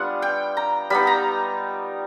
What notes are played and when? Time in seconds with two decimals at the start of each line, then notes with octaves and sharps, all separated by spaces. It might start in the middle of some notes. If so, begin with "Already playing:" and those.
Already playing: G3 B3 D4 F4 F#5 G#5
0.22 G5
0.57 A#5
0.90 G3 B3 D#4 B5
1.07 A#5